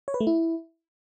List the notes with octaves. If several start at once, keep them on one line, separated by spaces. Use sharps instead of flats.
C#5
B4
A3
E4